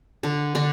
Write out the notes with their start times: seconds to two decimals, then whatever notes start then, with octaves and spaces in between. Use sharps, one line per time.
0.23 D3 D4
0.55 D3 D4